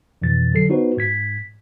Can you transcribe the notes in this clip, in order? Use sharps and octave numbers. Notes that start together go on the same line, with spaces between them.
F2 B2 E3 A6
D3 F#3 A4 C7
B3 D#4 F4 F#4 B4 C5
G#2 G#6 B6